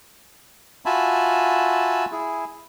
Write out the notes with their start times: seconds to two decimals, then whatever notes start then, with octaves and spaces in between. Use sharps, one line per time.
0.86 F4 F#4 E5 G#5 A5 B5
2.12 E4 G#4